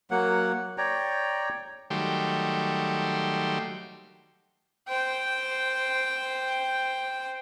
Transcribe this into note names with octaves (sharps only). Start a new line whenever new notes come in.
F#3 A#3 F#5
C#5 D5 G5 A#5
D#3 F#3 G3 A3 G4 C6
C5 G5